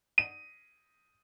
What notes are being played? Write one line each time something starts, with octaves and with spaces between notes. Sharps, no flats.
D#7